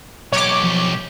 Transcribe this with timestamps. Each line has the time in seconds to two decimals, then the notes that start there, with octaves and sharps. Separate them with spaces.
0.32 B1 G4 C#5 D6
0.63 F3